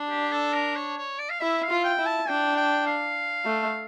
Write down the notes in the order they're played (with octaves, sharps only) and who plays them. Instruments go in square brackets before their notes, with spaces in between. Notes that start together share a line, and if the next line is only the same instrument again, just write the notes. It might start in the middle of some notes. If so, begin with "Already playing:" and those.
Already playing: [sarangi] D4
[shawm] G4
A4
A#4
C#5
C#5
D5
F5
[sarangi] E4 [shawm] E5
[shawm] F5
[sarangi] F4
[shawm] G5
[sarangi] E4
[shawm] A5
[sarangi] D4 [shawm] G5
[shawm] G5
F5
[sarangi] A3